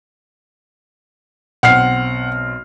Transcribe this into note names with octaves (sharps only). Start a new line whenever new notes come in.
B1 C4 F#5 F6 C7